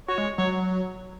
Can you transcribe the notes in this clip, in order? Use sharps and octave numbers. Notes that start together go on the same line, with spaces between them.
F#4 C#5
G#3
F#3 C#5